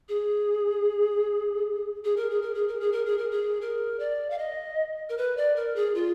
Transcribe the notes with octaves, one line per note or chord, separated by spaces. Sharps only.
G#4
G#4
A#4
G#4
A#4
G#4
A#4
G#4
A#4
G#4
A#4
G#4
A#4
D5
F5
D#5
A#4
B4
D5
A#4
G#4
F4